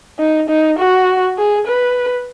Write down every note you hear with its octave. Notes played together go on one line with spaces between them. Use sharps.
D#4
D#4
F#4
G#4
B4